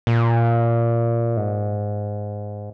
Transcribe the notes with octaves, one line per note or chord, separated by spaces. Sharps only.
A#2
G#2